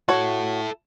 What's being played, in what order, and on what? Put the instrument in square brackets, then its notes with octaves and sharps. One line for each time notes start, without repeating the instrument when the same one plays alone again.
[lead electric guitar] E4 A4 [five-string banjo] F#4 C#5